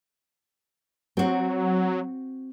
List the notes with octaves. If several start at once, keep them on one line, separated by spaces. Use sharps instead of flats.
F#3 C4 F#4